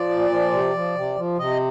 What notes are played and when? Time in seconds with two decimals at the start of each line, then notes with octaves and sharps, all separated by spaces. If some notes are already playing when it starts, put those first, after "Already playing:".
Already playing: F3 D5
0.09 A#2
0.30 F3
0.52 C3
0.74 F3
0.95 C3
1.16 F3
1.37 C3 D#5